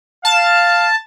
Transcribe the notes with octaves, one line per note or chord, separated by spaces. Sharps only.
F5 A5